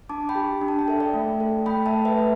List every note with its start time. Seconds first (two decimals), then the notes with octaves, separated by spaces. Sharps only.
0.09 D4 A5 D6
0.29 G5 B5
0.35 G4
0.61 D4
0.68 A5
0.79 G5
0.88 A4 E5
1.00 D5 G5
1.14 A3
1.40 A4
1.66 A3 G5 B5
1.86 E5 A5
1.93 A4
2.05 B4 E5
2.18 A3